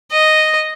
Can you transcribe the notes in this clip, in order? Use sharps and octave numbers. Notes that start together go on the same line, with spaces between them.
D#5